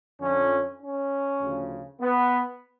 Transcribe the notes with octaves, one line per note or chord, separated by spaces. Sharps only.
F2 D3 F3 C#4
C#4
D2 C#3 F3
B3